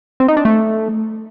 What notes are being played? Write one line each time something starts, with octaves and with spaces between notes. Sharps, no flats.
C4
D#4
D4
A3